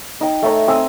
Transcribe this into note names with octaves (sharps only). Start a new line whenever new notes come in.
D#4 G5
A3 C#5 A#5
C4 G#5 D#6 E6